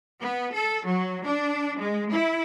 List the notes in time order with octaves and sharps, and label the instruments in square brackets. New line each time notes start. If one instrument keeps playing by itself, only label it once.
[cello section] B3
A4
F#3
D4
G#3
E4